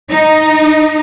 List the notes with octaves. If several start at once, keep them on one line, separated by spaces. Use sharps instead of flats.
D#4